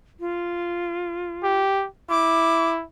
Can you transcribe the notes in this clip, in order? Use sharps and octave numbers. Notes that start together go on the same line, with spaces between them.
F4
G4
E4 D6